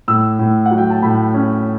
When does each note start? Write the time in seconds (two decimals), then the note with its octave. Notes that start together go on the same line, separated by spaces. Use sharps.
0.08 A2 E6
0.39 A2
0.66 F#5
0.71 F#3
0.78 G5
0.90 A5
1.02 A2 B5
1.34 C#4